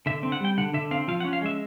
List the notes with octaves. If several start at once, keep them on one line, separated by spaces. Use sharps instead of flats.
D3 E5
C4
F#5
G3 G5
D3 F#5
D3 E5
C4 F5
F3 F5
F#5
C#4
F5
G#3 E5